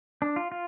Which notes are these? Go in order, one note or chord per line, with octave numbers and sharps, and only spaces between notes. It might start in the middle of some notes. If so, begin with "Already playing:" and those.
D4
F4
F4